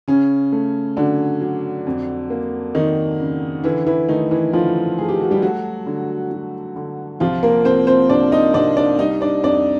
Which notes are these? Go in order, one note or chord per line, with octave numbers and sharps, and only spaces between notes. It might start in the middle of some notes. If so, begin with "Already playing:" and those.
C#3 C#4
A3
D3 F#3 D4
F#3
F2
A#3
F2 D#3 D#4
C#3
D3 E3 E4
E3 E4
D#3 A3 D#4
E3 E4
D3 F3 F4
A3 G#4
G4
F#4
G3 G4
F#3 A3 F#4
D3
F#3
D3
C2 F3 F4
A#3 A#4
C2 C4 C5
C4 C5
C2 D4 D5
D#4 D#5
C2 D4 D5
D4 D5
G3 D#4 D#5
D4 D5
F2 D4 D5